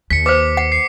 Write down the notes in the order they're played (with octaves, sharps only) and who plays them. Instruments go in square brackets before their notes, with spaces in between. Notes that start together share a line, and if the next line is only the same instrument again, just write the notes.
[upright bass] D#2 [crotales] B6 C#7
[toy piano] B4 C5 [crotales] D6 B6
[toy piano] F#5
[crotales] C7